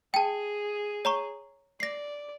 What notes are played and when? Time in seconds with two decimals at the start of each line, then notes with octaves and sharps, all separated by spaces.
0.14 G#4 G5 A5
1.05 C#5 A#5 C#6
1.80 D5 A#6 C7